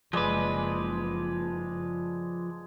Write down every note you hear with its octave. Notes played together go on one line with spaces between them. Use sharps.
F#1 F3 G#3 B4 D5